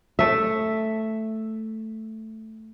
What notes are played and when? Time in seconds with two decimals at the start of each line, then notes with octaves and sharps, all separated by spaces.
0.19 A3 E5